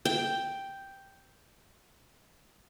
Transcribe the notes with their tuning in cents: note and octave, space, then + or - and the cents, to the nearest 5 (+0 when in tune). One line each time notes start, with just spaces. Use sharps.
G5 +0